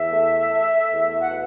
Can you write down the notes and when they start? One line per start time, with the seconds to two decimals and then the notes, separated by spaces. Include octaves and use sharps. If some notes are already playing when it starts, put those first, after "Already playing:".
Already playing: E2 E5
0.12 A3
0.51 A3
0.92 E2
1.21 F#5
1.31 B2